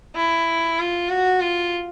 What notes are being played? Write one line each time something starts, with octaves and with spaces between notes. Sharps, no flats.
E4
F4
F#4
F4